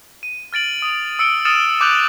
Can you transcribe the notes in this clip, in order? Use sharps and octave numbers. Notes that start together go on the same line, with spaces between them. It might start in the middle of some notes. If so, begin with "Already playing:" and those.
D#7
F6 A6 D7 F#7
D#6 F7
E6 C#7 D7 G7
D#6 F6 A6 C#7 D#7 E7
D6 F#6 G6 F7 F#7